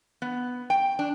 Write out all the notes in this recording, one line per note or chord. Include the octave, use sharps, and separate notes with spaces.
B3
G5
D4